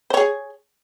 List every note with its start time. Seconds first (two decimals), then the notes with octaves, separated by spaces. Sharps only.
0.10 C5
0.14 C#5
0.17 G#4